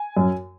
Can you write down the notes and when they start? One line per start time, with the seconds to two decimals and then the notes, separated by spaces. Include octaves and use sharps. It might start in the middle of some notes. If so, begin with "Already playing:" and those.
Already playing: G#5
0.17 F#2